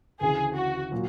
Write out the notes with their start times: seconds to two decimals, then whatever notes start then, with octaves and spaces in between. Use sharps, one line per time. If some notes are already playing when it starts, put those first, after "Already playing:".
0.21 D2 C#3 E3 G#4
0.56 F#4
0.92 A#2 F#3